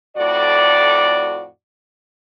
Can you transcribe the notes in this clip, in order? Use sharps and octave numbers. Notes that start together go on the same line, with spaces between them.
F2 A2 F#4 D5